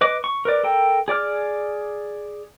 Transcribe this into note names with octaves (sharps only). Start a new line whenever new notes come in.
B4 D#5 D6
C#6
A#4 B4 D5
A4 A#4 G5
G#4 D5 D6 F6